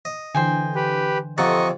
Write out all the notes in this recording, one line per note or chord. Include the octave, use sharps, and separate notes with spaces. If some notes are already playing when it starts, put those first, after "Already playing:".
D#5
D3 E3 C5 G5 G#5
G4 B4
F2 C3 A4 D#5 F#5 A#5 C#6